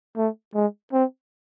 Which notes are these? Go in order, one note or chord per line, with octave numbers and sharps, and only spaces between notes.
A3
G#3
C4